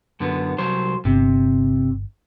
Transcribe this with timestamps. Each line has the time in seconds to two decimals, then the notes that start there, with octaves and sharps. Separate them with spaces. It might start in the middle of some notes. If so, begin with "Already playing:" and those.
0.20 F#2 D3 B3
0.58 C2 F#3 C5
1.05 G1 C3